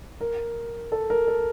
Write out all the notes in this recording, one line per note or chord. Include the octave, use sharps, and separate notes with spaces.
A#4
A4
A#4
A4